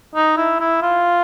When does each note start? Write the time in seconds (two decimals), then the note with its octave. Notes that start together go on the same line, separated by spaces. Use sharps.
0.15 D#4
0.37 E4
0.60 E4
0.82 F4